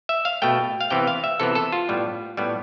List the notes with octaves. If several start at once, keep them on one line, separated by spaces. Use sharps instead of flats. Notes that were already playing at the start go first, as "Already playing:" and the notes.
E5
F5
B2 A3 G5
F5
C3 E3 B3 G5
F5
E5
C3 E3 B3 A4
A4
F4
A2 G3 B3
A2 G3 B3